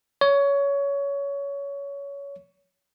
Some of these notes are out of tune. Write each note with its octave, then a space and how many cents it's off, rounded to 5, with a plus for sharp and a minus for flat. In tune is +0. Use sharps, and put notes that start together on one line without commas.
C#5 +20